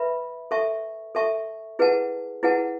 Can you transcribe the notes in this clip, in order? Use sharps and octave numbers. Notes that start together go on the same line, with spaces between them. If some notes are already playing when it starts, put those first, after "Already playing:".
Already playing: B4 E5 B5
A4 E5 A5 C#6
A4 E5 A5 C#6
E4 G#4 B4 F#5 A5
E4 G#4 B4 F#5 A5